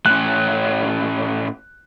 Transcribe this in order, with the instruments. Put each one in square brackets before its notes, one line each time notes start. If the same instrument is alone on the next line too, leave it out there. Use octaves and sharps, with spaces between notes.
[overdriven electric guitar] A2 C#4 [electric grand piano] F#6